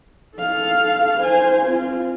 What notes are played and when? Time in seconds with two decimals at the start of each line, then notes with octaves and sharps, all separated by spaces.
0.37 A4 F5
1.20 C5 G#5
1.64 C4 F4